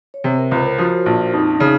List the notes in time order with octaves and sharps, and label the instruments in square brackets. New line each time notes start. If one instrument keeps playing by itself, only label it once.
[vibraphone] C#5
[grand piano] C3 [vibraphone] C5
[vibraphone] A#4
[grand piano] C#2 [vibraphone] C5
[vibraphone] A#4
[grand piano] F3 [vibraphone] F#4
[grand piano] A#1 [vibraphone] F4
[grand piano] F2 [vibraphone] D#4
[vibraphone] C#4
[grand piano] C#3